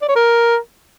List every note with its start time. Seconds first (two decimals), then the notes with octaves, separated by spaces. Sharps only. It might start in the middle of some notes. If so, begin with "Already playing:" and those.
0.02 D5
0.09 C#5
0.15 A#4